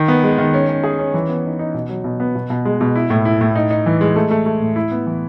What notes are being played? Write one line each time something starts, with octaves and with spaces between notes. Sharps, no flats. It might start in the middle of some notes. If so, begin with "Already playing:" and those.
Already playing: D#3
B3
G#3
D#3
C#4
C#4
G#4
C#4
E3
B3
D#4
D#4
B2
F#3
B2
B3
B2
B2
G#3
B2
E4
A2
E4
A2
D#4
D#4
E3
G#3
A3
A3
A3
A2
E4
B3
E3